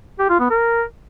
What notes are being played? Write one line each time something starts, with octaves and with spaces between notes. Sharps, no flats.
G4
F4
B3
A#4